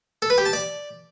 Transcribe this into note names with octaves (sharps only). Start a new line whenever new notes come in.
A4
B4
G4
A5
D5